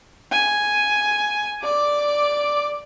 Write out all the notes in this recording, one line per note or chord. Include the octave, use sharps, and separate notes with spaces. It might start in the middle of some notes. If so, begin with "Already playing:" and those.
G#5
D5 D6